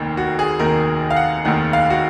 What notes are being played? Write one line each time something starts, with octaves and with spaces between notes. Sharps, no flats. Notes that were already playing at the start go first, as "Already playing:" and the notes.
Already playing: F1 D#2 D#3
F#4
G#4
F1 D#2 D#3 A#4
F5
F#5
F1 D#2 D#3 F#5
F5
F#4